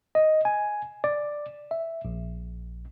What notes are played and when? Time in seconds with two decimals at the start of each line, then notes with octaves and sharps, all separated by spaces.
0.15 D#5
0.45 G#5
1.04 D5
1.71 E5
2.05 A#1